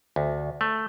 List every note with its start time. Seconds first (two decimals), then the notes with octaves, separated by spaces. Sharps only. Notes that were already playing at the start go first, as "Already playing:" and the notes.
0.16 D2
0.61 A3